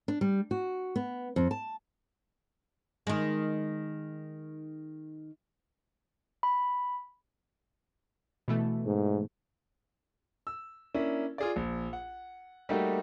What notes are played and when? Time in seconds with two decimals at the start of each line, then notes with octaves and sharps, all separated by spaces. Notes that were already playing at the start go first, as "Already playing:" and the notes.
0.08 D4
0.21 G3
0.51 F#4
0.96 B3
1.36 F2
1.51 A5
3.07 D#3 G#3
6.43 B5
8.48 B2 E3 A3
8.86 G#2
10.47 E6
10.94 A#3 C#4 D4 E4
11.38 F4 G#4 D5
11.56 A#1
11.93 F#5
12.69 G3 A3 A#3 D#4 F#4 G4